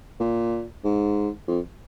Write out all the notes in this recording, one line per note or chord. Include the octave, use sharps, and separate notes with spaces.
A#2
G#2
F2